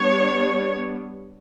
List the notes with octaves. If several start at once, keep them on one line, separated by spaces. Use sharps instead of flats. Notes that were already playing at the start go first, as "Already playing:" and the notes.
Already playing: G3 B3 D4 C#5